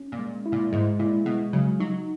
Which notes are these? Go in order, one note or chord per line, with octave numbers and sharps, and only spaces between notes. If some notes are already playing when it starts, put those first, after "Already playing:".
Already playing: C#4
A#2
G#3
E4
A#2
G#2 G#3
A#2 E4
B2 G#3
C#3 F#3
F#3 D#4